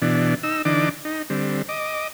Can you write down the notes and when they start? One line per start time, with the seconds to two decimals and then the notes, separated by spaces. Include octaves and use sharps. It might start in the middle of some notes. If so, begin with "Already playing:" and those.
0.02 B2 E3 D4
0.43 D#4 E6
0.65 D3 E3 D4 D#4 D6
1.05 D#4
1.30 D3 G3 C4
1.69 D#5 D6